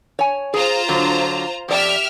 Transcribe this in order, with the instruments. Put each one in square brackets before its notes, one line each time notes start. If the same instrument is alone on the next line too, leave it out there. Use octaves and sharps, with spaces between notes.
[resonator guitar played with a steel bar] C#5 G#5
[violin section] F4 C5 A#5 [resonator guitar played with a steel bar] G#4
[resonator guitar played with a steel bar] D3 F#3
[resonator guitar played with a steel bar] F2 D5 [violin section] G4 E5 F6